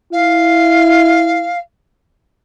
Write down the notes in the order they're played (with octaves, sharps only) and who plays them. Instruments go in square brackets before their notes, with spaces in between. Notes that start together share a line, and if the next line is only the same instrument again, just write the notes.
[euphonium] E4 [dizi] F5